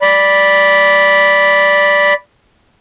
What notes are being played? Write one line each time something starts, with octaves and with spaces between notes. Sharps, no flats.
D5 B5